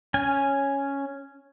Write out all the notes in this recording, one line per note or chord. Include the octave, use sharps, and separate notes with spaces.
C#4 G#5